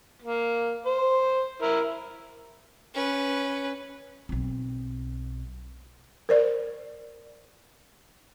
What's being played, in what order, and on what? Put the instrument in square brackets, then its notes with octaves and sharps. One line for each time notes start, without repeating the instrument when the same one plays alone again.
[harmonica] A#3
C5
E4 A#4
[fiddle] C#4 B4
[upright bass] B1 C4
[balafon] A#4 C5 D5